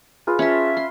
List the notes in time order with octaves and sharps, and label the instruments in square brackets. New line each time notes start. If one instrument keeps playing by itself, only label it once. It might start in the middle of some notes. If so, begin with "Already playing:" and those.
[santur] F4 B4 [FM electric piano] G#4
[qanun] C#4 A5 [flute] E5
[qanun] C6